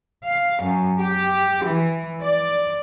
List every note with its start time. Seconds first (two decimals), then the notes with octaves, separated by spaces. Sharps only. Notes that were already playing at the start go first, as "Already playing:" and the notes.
0.24 F5
0.62 F#2
1.00 G4
1.65 E3
2.22 D5